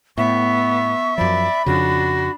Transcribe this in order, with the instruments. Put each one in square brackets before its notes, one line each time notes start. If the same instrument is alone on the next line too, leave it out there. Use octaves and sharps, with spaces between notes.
[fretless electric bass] A2 [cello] B3 [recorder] E5 [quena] C#6
[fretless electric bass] F#2 F3 [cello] D5 [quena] B5
[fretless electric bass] F2 C#3 [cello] D4 [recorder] F#4